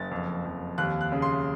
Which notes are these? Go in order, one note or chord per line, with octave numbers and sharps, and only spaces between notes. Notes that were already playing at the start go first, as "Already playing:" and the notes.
Already playing: F#1 A6
F2
F2
D#2 F#6
F#6
C#3
C6